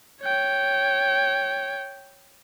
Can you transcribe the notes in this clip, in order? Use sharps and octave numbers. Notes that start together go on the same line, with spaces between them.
C#5 G5